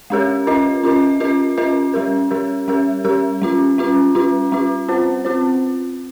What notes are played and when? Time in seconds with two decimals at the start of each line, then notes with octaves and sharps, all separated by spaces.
0.10 G#3 C#4 G4 A#4
0.47 C#4 F4 A#4 D#5
0.83 C#4 F4 A#4 D#5
1.20 C#4 F4 A#4 D#5
1.57 C#4 F4 A#4 D#5
1.94 G3 C#4 G4 A#4
2.31 G3 C#4 G4 A#4
2.68 G3 C#4 G4 A#4
3.04 G3 C#4 G4 A#4
3.41 G3 C#4 F4
3.78 G3 C#4 F4
4.15 G3 C#4 F4
4.52 G3 C#4 F4
4.88 C4 F4 C5
5.25 C4 F4 C5